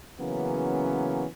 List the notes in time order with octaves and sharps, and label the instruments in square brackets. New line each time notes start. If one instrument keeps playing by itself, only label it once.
[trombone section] C#3 E3 F#3 A#3 B3 C#4